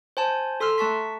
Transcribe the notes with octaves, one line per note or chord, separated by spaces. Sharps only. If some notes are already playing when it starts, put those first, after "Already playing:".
C5 G#5 A5
A4 C6 E6 F6
A3 A5 C#6 B6